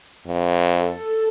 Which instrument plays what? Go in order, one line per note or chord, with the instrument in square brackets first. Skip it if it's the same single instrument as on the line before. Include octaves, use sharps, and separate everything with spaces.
[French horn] F2
[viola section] A4